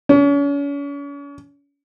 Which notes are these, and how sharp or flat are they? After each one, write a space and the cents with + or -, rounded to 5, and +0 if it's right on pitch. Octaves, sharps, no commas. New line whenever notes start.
C#4 +40